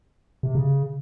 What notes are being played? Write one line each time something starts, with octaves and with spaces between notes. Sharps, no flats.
C3
C#3